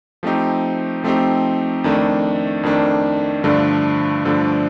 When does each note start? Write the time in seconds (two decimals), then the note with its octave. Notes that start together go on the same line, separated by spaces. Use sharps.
0.23 F3 A3 C4 D#4 G4
1.04 F3 A3 C4 D#4 G4
1.84 F2 D#3 A3 D4
2.63 F2 D#3 A3 D4
3.44 G2 D3 F3 A3 D4
4.25 G2 D3 F3 A3 D4